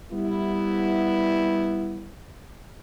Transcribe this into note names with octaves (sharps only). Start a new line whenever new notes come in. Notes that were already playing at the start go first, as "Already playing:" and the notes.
G3 B3 E4